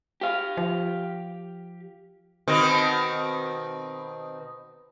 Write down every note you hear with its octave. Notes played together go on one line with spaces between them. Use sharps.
G4 F5
F3
B2 D#3 C4